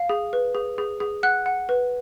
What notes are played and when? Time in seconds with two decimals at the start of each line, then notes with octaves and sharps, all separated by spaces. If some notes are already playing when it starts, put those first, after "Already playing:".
Already playing: F5
0.09 G#4
0.33 B4
0.55 G#4
0.78 G#4
1.00 G#4
1.23 F#5 F#6
1.46 F#5
1.69 B4